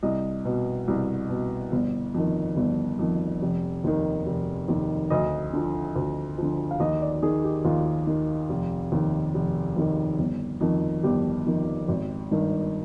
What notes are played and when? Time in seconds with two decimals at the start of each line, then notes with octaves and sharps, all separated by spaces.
0.03 C2 D#5
0.45 B2
0.88 C2
1.30 B2
1.72 G1
2.14 F2 D#3
2.57 G1
2.99 F2 D#3
3.42 F1
3.84 D#2 D#3
4.26 F1
4.68 D#2 D#3
5.10 D2 D#5
5.53 D3 F3
5.96 D2
6.38 D3 F3
6.71 F5
6.80 D#2 D#5
7.02 D5
7.22 D#3 G#4
7.44 G4
7.65 D#2 F4
8.07 D#3
8.49 F1
8.92 D#2 D#3
9.34 F1
9.77 D#2 D#3
10.19 G1
10.61 F2 D#3
11.04 G1 G4
11.46 F2 D#3
11.88 G#1
12.31 G2 D#3